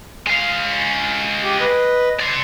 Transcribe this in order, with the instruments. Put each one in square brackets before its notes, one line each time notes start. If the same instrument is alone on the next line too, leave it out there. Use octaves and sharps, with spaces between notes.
[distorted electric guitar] G#3 F5
[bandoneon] G4
B4 D#5
[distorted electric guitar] D5 C6